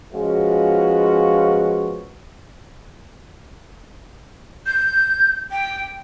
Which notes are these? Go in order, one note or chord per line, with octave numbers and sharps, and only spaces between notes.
F3 G#3 B3 C#4 F4 F#4
G6
G5